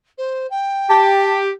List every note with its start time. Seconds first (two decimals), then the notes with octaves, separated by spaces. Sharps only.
0.17 C5
0.50 G5
0.89 G4 A5